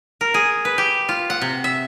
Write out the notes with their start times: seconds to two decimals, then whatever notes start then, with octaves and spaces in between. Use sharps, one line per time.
0.21 A#4
0.34 G#4
0.65 B4
0.78 G4
1.09 F4
1.30 F#5
1.41 C3
1.64 E5